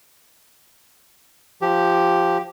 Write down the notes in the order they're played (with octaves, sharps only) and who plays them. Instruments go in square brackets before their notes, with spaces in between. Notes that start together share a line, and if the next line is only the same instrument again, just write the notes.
[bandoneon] F3 G4